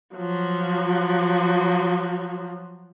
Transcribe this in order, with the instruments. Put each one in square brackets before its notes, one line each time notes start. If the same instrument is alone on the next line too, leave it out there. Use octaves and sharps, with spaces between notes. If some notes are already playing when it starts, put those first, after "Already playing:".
[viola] F3 F#3